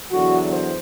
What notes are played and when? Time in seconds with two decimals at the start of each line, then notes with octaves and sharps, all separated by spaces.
0.11 E2 D3 F#3 F#4
0.51 C5